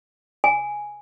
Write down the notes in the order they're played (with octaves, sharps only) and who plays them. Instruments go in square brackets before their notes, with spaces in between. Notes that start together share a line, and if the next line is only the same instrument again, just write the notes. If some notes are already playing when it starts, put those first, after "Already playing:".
[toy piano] G#5